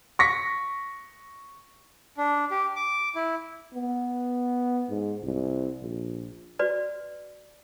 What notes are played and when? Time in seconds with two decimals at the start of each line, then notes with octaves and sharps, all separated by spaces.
0.19 C#6 A#6 B6 C#7
2.18 D4
2.51 G4
2.76 D6
3.15 E4
3.74 B3
4.90 G#2
5.23 C2
5.81 A#1
6.59 F#4 B4 D5